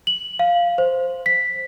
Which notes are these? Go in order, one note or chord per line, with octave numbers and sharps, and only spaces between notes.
F#7
F5
C5
B6